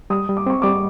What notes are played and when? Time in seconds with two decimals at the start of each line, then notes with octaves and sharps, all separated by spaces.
0.10 G3 D#6
0.29 G3
0.37 D6
0.46 C4 C#6
0.62 G3 D6